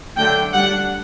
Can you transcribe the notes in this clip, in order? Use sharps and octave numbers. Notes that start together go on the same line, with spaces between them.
D3 F#3 A3 D4 G5
G3 D4 F#5